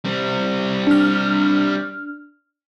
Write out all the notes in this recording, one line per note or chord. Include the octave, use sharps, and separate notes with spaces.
G3 C4
D4 F6